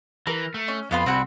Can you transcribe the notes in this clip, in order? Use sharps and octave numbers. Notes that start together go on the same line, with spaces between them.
E3 A#4
A3
C#4
F2 B3 F4 B5
C2 C4 F#4 B5